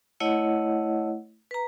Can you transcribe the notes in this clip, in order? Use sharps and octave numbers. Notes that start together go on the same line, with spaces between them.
A3 E4 C#5 D#5 F#5
B4 A#5